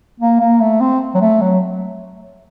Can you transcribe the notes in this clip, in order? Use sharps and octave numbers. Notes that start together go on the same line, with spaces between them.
A#3
A#3
A3
C4
F#3
A3
F#3